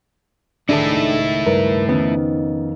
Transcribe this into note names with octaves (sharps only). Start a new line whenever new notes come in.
C#2 D#3 A3 D4 E4 G#4 A4
G2 A#4 B4
F2 D#3 B3 C#4